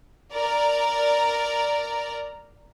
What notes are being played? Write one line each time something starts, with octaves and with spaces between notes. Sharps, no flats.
A#4 D5 A#5